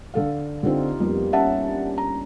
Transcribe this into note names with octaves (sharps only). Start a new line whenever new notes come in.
D3 A4 F5
D3 C4 D#4 F4 G4
F2 G3 A#3 B3
C#4 E5 F#5 A5
D4
A#5